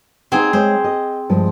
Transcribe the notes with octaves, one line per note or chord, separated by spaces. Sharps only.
C4 D#4 G#4 F#5
G#3 C5 C#5 E5
D#5
G2 F3 G#3